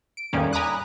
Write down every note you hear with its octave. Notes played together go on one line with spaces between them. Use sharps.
D7
E2 A2 D#3 G3 A#3 C#4
G#5 A#5 B5 D6 D#6 F#6